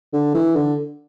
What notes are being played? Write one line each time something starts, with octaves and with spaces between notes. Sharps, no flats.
D3
E3
D3